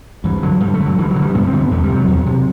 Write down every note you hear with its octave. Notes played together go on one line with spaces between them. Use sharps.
G2 E3
D3 F#3
G2 G3
A3
D3
F#3
G2 E3
F#3
D3
G3
G2 B3
C4
D3
B3
E2 A3
G3
C3
F#3
E2
C3